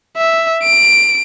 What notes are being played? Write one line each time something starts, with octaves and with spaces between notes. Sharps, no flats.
E5
D7